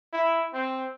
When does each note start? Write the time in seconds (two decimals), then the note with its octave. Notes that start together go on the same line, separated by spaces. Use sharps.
0.13 E4
0.53 C4